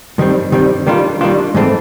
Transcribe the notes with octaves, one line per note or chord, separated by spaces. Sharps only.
G2 D#3 G3 C4
G2 D#3 G3 C4
D#3 G3 A#3 D4 F4
D#3 G3 A#3 D4 F4
G#2 E3 A3 C4